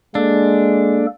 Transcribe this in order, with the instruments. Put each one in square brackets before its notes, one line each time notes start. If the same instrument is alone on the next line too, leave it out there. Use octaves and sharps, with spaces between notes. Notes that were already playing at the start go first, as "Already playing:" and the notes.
[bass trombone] G#3 [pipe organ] A#3 A4 [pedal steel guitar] D4